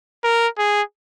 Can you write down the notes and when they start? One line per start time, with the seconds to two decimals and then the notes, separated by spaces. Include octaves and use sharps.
0.24 A#4
0.58 G#4